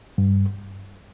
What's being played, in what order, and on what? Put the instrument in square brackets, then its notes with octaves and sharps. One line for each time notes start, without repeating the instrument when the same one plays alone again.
[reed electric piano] G2